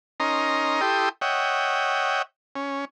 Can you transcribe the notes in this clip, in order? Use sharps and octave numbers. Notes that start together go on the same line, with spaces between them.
C#4 D#4 A#4 D#5 A#5 C6
E4 G4 A4 G5 C6 D#6
C#5 D#5 E5 F#5 G5
C#4